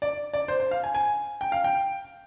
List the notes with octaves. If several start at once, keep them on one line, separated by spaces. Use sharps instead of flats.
D5
D5
C5
C5
F5
G#5
G#5
G5
F5
G5